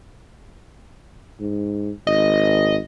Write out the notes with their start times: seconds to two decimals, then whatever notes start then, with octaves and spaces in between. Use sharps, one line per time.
1.40 G#2
2.07 G#1 D#5